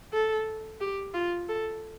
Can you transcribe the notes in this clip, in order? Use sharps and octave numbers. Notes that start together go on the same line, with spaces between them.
A4
G4
F4
A4